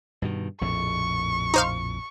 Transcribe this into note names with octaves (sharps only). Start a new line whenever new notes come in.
G2 B2 D#3
A#1 F2 A2 C#6
D#4 C5 F5